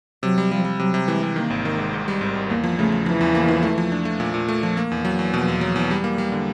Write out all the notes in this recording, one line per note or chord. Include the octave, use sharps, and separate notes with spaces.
C3 F#3
G3
F3 G3
G3
C3 F#3
C3
E3 G#3
C3
D#3 A#3
G#1
D#3
G#2
G#2
G3
G#1
G#1
E2 A#3
F3
C#3 A3
F3
E3 F3
E2
A#3
F3
A3
F3
D4
A3
A#2
A#2
A3
F3
A#3
E2
F#3
E2
B2 F3
E2
F#3
E2
G3
A#3
G3
D3